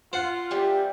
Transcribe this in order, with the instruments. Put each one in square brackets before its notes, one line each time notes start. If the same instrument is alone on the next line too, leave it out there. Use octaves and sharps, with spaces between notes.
[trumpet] F4 [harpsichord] C5 F#5
[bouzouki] E3 G3 C4 [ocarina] G4